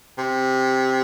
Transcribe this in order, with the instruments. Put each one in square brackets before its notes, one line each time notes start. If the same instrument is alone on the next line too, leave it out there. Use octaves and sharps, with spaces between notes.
[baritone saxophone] C3